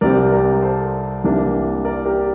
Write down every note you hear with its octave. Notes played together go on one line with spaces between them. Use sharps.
C2 C3 G3 C4 A#4 D5
A#4 D5
A4 C5
C2 C3 E3 A#3 D4
A#4 D5
G4 A#4